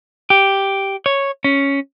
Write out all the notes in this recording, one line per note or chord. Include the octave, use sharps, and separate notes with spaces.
G4
C#5
C#4